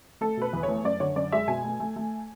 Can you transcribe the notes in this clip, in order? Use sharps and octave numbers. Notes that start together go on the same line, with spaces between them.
A3 A4
B2 B4
E2
C#5
A3
F#2 D5
D3 C#5
F#2 D5
G#3 E5
B2 G#5
A3
A3
A3